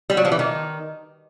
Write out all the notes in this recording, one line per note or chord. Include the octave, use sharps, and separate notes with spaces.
G3
F#3
F3
E3
D#3